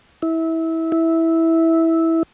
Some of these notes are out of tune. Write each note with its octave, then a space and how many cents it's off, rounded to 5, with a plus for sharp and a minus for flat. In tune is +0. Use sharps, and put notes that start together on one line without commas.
E4 -20
E4 -10